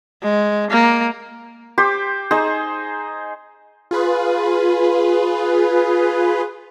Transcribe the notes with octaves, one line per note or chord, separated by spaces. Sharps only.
G#3
A#3
G4 C5 D6
D#4 G#4 C5
F4 G#4 B4